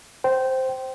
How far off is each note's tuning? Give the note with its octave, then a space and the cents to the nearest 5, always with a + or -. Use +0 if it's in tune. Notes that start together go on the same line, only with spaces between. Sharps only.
C5 +0 G5 -20